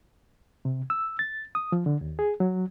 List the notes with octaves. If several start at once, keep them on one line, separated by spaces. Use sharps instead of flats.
C3
E6
A6
D#6
F3
D3
D#2
G#4
F#3